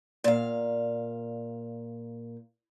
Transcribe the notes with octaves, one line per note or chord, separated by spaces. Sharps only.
A#2 F5